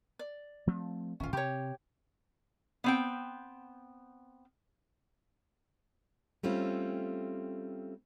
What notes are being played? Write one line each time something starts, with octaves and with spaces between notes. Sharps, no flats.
D5
F3 A3 C4
D1 G#1 C#4 F4
C3 G4 C#5
B3 C4 G5
G3 A3 C4 C#4 F4